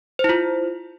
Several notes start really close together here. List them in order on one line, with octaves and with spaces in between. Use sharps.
C5 E4 F4